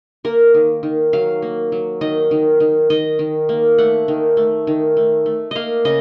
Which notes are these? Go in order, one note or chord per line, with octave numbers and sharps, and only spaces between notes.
A#3 A#4
D#3
D#3
F#3 F5
A#3
F#3
D#3 D#5
D#3
D#3
D#3 D#5
D#3
A#3
A3 F#5
D#3
A3
D#3
A3
A3
A#3 D#5 F5
C#3 D#5